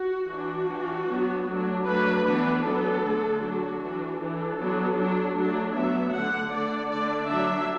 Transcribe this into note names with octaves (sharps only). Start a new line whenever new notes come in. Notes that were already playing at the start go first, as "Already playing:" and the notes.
Already playing: F#4
E3 D4 F#4
E3 D4
F#3 B3 D4
F#3 A3 D4
F#3 A3 D4 B4
E3 B3 D4 B4
F#3 B3 D4 A4
D3 A3 D4
F#3 D4 F#4
E3 D4
E3 D4 A4
F#3 B3 D4
F#3 D4
F#3 A3 D4
F#3 B3 D4 E5
D3 A3 D4 F#5
D3 A3 D4 D5
D3 A3 D4 D5
F#3 D4 E5